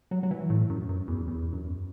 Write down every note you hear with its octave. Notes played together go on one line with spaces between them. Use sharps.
F#3
F#3
E3
A2
F#2
F#2
E2
E2
F#2